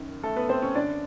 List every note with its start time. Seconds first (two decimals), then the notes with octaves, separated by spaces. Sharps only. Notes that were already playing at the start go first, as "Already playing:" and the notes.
Already playing: F#2 D#3
0.23 A3 A4
0.36 B3 B4
0.49 C4 C5
0.62 C#4 C#5
0.75 F#2 D3 D4 D5